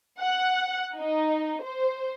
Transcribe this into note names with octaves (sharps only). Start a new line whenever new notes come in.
F#5
D#4
C5